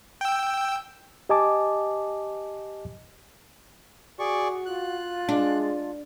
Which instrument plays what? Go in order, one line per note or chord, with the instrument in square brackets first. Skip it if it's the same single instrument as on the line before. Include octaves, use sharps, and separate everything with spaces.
[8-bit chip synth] G5 E6
[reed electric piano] G4 D#5 G#5 A5 D6
[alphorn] F#4 [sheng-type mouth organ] G#4 D5 C#6
[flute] F4 [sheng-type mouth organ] F#6
[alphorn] G#3 [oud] D4